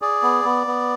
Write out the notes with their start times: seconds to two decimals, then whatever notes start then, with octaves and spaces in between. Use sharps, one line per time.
0.02 G#4 D5
0.23 B3
0.45 B3
0.67 B3